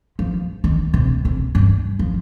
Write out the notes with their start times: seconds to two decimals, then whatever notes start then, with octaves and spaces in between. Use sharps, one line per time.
0.19 F3
0.64 D#3
0.94 C3
1.25 C3
1.55 G2
1.99 F3